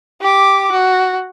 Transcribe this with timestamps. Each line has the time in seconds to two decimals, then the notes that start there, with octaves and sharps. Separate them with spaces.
0.21 G4 D6
0.72 F#4